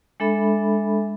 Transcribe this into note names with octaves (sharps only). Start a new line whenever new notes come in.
G#3 D4 A4 E5 B5